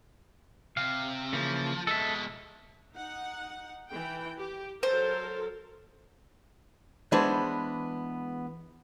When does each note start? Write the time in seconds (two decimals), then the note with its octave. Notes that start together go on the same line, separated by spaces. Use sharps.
0.77 C3 F5
1.33 C#3 E3 F3 A#3
1.87 B2 G#3 A4 E5
2.93 D#4 F#5
3.91 E3 G5
4.38 G4
4.83 F#3 A4 A#4 C5
7.12 E3 G#3 B3 D4 C5